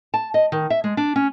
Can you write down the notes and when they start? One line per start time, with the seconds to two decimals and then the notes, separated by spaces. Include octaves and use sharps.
0.14 A5
0.34 D#5
0.52 D#3
0.70 E5
0.84 G#3
0.97 D4
1.16 C#4